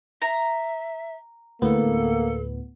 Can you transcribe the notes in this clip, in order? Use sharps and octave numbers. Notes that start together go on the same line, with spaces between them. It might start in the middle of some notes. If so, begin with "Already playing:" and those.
E5 A#5
D2 A2 A#3 B3 A4